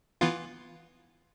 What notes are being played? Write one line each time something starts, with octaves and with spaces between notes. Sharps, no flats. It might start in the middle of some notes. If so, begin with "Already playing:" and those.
E3 B3 F4